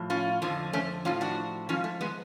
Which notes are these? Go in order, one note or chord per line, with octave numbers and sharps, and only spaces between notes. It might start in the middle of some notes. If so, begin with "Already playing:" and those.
Already playing: A2 F3
C#4 F4
F2 D3 F3
A3 C#4
A2 F3 C#4 F4
D4 F#4
G#2 F3 C#4 F4
A3
G#3 B3